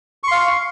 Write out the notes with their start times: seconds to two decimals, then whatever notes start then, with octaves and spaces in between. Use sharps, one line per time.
0.23 C#6
0.27 C6
0.31 F5